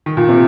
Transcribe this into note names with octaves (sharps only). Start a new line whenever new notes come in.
D#3
A#2
C3